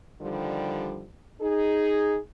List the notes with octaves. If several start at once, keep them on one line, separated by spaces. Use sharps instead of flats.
D3 D#3 F3 G3
D#4 G#4